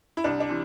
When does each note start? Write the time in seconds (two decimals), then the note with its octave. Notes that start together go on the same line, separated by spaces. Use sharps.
0.17 E4
0.24 C2 D4
0.40 D4
0.49 C3 E3